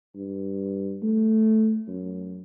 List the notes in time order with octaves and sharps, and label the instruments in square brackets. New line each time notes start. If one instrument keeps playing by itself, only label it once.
[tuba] G2
A3
F#2